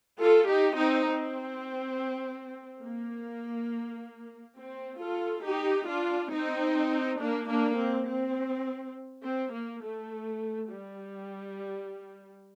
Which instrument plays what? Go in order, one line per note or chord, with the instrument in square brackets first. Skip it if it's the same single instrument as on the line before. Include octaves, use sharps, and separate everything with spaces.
[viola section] F4 A4
D#4 G4
C4 D#4
C4
A#3
C4
F4 A4
D#4 G4
D4 F4
C4 D#4
A#3 D4
A#3 D4
C4
C4
C4
A#3
A3
G3